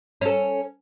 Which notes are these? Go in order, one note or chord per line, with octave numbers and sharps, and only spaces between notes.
C#4 A4